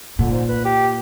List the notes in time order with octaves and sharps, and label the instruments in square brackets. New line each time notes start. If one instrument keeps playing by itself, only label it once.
[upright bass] A#2 [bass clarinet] D3
[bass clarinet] G#2
B4
G4